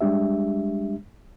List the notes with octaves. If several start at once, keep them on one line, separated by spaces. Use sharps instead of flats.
G3 G#3 D4 G4 E5